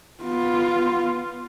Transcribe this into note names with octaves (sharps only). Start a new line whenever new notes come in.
B3 F4